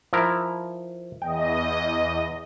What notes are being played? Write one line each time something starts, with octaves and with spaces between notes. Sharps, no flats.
F3 E4 A#4
E2 D#5 G5